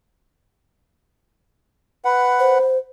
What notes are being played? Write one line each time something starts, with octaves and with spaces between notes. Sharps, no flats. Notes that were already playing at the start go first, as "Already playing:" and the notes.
B4 F#5
C5